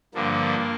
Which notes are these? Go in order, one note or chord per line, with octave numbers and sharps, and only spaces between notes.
G2 D3 F3 A#3